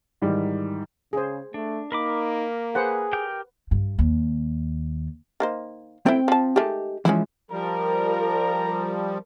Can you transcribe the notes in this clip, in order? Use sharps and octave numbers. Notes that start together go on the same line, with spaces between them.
G#2 D#3 E3 G3
C#3 G#4 C5
A3 D4
A#3 D#4 A#4 B5 D6
G#4 B4 C5 F#5
G4 A#4 G5
G2
D#2
D#3 A#3 C5
A3 C4 E4 G5
F3 A5
D#3 G#3 A3 G4
E3 F3 G#3 C#4 E4
F3 G3 A#4 A#5